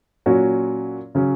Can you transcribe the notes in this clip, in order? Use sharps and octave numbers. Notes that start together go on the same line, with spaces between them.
A#2 F#3 C#4 F#4
C#3 F#3 C#4